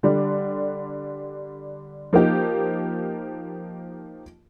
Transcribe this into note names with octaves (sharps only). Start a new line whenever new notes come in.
D3 G3 D4
F3 A#3 D#4 G4